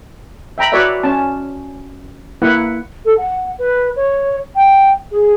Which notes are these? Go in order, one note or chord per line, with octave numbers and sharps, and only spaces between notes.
E5 G5 A#5 B5
F#4 B4 C#5 D5 E5
C#4 A5
A#3 E4 B4 F#5
A4
F#5
B4
C#5
G5
G#4